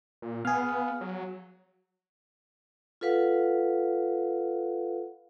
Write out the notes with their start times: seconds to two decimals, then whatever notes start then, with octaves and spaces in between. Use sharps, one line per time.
0.22 A#2
0.45 B3 G#4 F5
1.01 F#3
3.01 F4 A4 B4 F5 F#5